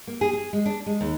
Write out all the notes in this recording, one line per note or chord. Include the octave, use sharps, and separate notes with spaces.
A#3
G#4
G#4
G#3
D4
G#3
D#2